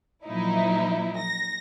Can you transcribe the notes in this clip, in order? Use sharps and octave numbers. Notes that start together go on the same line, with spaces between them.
A#2 F3 F#3 D#4 E4
A#6